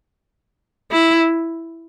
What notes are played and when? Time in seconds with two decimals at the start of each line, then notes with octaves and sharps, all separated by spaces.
0.91 E4